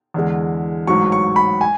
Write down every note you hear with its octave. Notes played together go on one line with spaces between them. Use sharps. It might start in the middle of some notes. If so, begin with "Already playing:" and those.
E2 D3 G#3
A1 G#2 F#3 C#6
C#6
B5
G#5